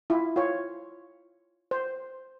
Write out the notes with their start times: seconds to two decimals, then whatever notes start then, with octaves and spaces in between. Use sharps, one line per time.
0.10 E4 F4
0.36 F4 C#5
1.71 C5